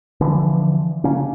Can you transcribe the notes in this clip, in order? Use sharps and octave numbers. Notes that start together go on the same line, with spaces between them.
D3 E3 F3
C#3 A#3 C#4